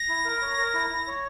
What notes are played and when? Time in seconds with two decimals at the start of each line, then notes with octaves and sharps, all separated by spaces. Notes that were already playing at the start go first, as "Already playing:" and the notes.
Already playing: A#6
0.08 E4
0.25 A#4
0.42 C#5
0.58 A#4
0.74 E4
0.90 E4
1.07 C#5